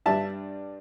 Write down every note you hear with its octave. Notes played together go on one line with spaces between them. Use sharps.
G2 G3 D4 E5 A5